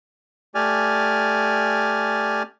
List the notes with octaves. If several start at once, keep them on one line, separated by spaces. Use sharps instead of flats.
A3 G4 D5 G#5 F6